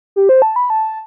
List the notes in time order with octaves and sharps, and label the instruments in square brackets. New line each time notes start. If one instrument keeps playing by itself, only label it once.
[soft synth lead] G4
C5
A5
B5
A5